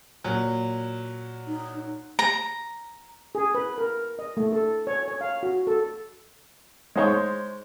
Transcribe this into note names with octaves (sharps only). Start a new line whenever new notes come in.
A#2 F#3
D#4
A#5
G#4
B4
A#4
D#5
A3
A4
C#5
C#5
F5
F#4
A4
G#3 D#4 C5 C#5